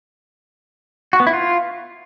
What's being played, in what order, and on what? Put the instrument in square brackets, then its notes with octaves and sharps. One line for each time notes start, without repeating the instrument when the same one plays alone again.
[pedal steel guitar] F#4
B3
E4
F4